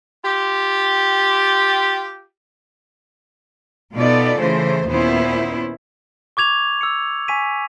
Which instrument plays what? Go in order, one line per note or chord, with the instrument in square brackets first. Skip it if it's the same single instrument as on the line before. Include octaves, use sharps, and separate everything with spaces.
[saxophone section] F4 G4
[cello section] B2 B3 D#4 F4 A4 D5
C#3 E3 A3 C5
D#2 A#2 B3 C#4 E4 C5
[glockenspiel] C#6 D6 G#6 F7
E6 C#7
G#5 C#6 B6 D#7